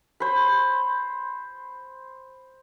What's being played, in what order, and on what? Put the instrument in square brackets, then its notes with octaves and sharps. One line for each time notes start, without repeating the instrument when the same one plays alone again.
[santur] C5 B5